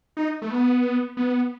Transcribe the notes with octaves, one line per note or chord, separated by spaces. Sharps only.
D#4
A3
B3
B3